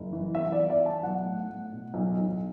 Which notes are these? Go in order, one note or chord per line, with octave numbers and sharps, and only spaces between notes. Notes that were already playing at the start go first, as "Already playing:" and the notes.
Already playing: F#1
E3
B3 E5
D5
E3
D5
B3
A5
B1 F#5
A2
A2
B2
B1
B1